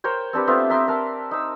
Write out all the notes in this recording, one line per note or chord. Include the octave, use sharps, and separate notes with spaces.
A#4 C5 C#5 G5
C4 D4 G4 B4
A3 B3 C4 F4
E5 A#5 C6 D6
A#4 F#5 A5
D#4 E6